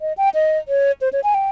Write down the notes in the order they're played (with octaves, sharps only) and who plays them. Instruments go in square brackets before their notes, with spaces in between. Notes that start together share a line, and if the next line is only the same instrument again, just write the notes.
[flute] D#5
G5
D#5
C#5
C5
C#5
G#5
G5